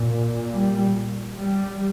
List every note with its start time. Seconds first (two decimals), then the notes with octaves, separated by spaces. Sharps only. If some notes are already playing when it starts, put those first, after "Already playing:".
Already playing: A#2
0.53 G3
1.37 G3